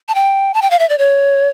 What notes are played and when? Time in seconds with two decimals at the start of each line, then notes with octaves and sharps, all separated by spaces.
0.08 A5
0.15 G5
0.54 A5
0.62 G5
0.71 F5
0.79 E5
0.89 D5
0.98 C#5